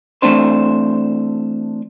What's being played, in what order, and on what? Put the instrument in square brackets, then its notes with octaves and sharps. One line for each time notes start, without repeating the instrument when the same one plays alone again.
[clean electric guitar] E3 A3 C4 D4 C5